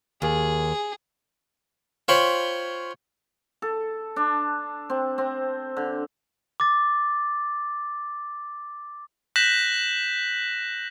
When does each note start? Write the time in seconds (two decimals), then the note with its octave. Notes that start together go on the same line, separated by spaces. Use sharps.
0.22 D#2 G#4
2.08 F4 C5 C#5 G5 B5 C6
3.62 A4
4.16 D4
4.90 C4
5.18 C4
5.77 D3
6.60 D6 A6
9.36 F#6 G6 A#6 B6 E7 F#7